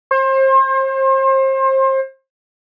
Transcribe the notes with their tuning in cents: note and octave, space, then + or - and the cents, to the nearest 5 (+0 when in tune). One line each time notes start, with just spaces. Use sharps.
C5 +35